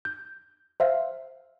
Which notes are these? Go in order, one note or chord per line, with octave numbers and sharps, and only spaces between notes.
G6
C5 E5 F5